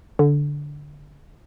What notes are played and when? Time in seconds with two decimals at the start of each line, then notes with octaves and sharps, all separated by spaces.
0.19 D3